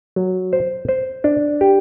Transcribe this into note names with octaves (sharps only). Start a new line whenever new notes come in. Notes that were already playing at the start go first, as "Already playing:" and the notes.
F#3
C5
C5
D4
G4